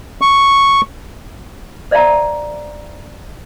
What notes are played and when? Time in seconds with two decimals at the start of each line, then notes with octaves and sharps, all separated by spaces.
0.21 C#6
1.91 C5 D5 E5 F5 A5 A#5